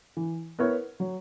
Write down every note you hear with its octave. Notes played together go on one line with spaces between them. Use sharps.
E3
B3 E4 A#4 C#5
F#3